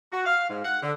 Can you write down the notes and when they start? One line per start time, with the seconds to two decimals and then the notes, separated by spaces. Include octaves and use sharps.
0.13 F#4
0.26 F5
0.50 G#2
0.65 F#5
0.83 D3